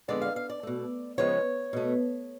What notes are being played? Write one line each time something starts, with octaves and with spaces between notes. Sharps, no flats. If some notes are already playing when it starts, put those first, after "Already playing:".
F2 D3 G#3 B3 D5
F5
F5
D5
B2 A3
C#3 F3 G#3 B3 C#5
B2 A3